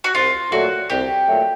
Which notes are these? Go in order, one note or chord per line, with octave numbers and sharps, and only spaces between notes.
F#4
C2 F4
A#2 F#3 A3 F#4
C2 G4
A#2 F#3 A3